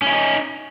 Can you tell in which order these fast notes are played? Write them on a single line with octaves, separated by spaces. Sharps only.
C#4 E4 D#4